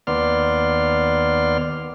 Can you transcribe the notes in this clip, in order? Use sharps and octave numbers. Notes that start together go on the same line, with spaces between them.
D#2 B3 D5 C6 F6